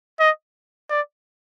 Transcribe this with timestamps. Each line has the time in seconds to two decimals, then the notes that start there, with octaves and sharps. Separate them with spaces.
0.20 D#5
0.90 D5